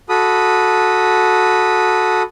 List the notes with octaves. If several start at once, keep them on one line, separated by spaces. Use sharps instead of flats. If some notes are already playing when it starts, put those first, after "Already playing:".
F#4 A4 B5 D#6